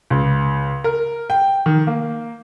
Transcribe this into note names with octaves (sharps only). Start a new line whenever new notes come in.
C#2
A#4
G5
D#3
A#3